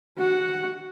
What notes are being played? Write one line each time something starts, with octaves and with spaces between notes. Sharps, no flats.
F#4 F#5